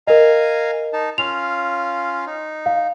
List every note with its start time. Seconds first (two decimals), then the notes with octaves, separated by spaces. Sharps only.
0.07 A#4 D#5 F5 G#5 A#5
0.93 D#4 A5
1.18 C#4 F4 F5 F7
2.27 D#4
2.66 F5